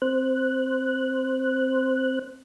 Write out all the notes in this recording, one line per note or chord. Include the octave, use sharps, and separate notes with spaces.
C4 C5 F#6